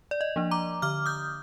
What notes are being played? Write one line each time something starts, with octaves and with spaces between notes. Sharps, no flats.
D5
D#5
F3 A#3 D4
A#5 D6
D3 D6 F6
D#6 G6